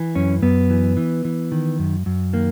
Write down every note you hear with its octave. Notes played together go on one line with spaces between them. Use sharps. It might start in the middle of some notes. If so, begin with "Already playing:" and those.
Already playing: E3
F#2 C#4
F#2 B3
E3
E3
E3
D#3
F#2
F#2
D#3 A#3